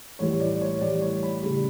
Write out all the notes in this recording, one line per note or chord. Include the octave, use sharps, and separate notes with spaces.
A2 E3 G3 C#5
D5
C#5
A2 E3 G3 D5
C#5
B5
C#3 G3